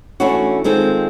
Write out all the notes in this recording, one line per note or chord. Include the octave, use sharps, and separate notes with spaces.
E3 A3 C#4 D4 E4 F#4
D#3 G#3 C4 F4 A4